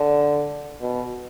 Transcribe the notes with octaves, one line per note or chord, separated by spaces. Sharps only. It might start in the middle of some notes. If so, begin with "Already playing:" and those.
Already playing: D3
B2